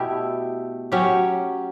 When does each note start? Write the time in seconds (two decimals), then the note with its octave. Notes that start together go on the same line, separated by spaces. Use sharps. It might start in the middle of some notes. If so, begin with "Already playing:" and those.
Already playing: B2 A3 E4 G4
0.92 F#3 C#4 G4